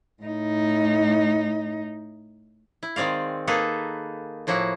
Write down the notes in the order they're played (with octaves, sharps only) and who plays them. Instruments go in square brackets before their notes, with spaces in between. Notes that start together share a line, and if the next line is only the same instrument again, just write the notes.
[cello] A2 D#4
[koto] E4
D#3 G#3 C4 D5 F5
A#3 D#4 G#4 A4 B4
A2 F3 A#3 E4 F#4